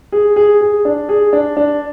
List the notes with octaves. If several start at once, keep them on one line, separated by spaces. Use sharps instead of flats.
G#4
G#4
G#4
D4
G#4
D4
D4